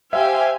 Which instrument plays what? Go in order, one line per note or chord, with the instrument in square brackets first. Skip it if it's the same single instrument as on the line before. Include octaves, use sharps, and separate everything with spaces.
[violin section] G4 C5 F5 G#5 [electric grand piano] E5